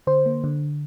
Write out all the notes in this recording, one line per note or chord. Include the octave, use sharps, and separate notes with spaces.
D3 C5
A#3
D3